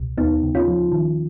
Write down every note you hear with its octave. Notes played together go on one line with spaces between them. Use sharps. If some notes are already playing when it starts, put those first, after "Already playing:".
Already playing: C#2 B2
D#2 B3 D#4
C#3
C#4 F4
F3
D#3